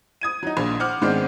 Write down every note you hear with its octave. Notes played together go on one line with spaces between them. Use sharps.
D#6 G#6 D#7
F#3 D#4
A#1 A#2
C5 F#5 D6 F6
G#2 D#3 B3 C4 D4